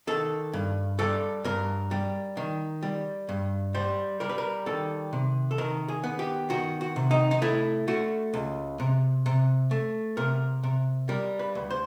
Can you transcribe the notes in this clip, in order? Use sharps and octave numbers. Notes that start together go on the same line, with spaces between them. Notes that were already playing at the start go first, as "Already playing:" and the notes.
D#3 A4
G2
G3 A4
G2 A#4
G3
D#3
G3
G2
G3 C5
G3 A#4
B4
A#4
D#3 A4
C3
A4
D#3 A#4
G#4
B3
G4
D#3 F#4
F#4
C3
D#4
D#4
A3 E4
A3 F#4
C#2
C3
C3
A3
C3 A#4
C3
G3 A#4
B4
D2
C5